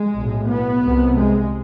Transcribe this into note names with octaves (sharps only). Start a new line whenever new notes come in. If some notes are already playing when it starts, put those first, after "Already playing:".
Already playing: G#3
B1 A2
B3
C2 C3
G#3